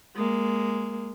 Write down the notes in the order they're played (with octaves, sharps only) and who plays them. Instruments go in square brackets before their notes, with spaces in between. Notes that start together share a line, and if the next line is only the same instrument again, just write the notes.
[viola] G#3 A#3